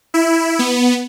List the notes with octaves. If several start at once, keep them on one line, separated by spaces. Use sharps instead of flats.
E4
B3